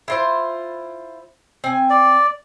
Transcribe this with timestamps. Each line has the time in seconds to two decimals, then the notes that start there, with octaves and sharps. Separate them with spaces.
0.08 E4 F4 C5
1.64 C4 G#5
1.90 D5